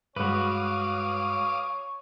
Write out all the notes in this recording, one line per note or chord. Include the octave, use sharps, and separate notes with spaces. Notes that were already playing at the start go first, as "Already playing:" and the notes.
G2 G#3 F#4 B4 C#5 F5 D6 D#6